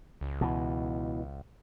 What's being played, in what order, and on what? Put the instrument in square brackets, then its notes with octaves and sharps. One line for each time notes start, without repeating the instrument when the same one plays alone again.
[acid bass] C#2
[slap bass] B2 E3